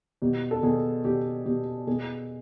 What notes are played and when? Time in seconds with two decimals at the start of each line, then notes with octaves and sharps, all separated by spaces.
0.22 B2 G4
0.51 A4
0.63 B2 G#4
1.04 B2 G4
1.46 B2 G4
1.87 B2 G#4